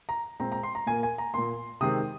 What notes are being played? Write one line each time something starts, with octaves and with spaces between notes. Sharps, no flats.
A#5
A#2 G#3 C4 A#5
A#5
C6
A#5
A#2 A#3 G#5
G#5
A#5
A#2 A#3 C6
C3 D#3 G#3 C4 D#6